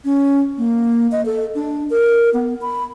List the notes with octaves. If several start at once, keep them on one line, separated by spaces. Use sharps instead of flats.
C#4
A#3
D#5
A4
D4
A#4
B3
B5